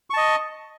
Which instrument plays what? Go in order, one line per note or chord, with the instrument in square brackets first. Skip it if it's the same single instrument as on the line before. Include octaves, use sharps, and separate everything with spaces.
[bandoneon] C#6
A5
D#5